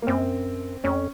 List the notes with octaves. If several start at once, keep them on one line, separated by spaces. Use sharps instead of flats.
A#3
F#2 C4
F2 C#4